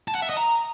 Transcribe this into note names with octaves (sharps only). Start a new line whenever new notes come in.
A5
F#5
E5
D#5
A#5